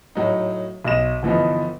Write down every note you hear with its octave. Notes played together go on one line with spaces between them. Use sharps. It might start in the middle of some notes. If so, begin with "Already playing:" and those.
A2 F#3 D#4
B1 B2 D#5 E7
G1 E3 F3 B3 D#4